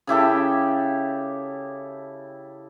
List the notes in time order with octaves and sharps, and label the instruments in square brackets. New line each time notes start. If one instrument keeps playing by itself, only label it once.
[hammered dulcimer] C#3 E4 G4 A4